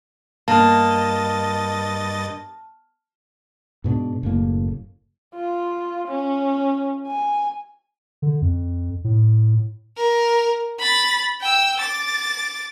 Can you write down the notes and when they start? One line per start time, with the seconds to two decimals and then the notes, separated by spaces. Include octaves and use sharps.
0.48 G2 A#3 D#5 A5 F6 A6
3.84 G#2 B2 B3 D4
4.23 F#1 A2 A#3
5.35 F4
6.08 C#4
7.07 G#5
8.22 D3
8.42 F2
9.04 A2
9.97 A#4
10.80 B5 A6
11.42 G5 E6
11.80 D6 A6